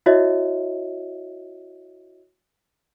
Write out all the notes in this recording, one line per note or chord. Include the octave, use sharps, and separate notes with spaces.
E4 F#4 C#5 D#5 E5